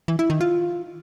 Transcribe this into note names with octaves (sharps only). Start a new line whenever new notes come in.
E3
E4
D#3
F4